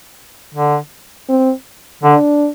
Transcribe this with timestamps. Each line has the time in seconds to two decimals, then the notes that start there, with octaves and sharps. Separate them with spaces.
0.55 D3
1.29 C4
2.04 D3 D4